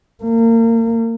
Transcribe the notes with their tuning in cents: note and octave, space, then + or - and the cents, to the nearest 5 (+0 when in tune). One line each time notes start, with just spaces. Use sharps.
A#3 -30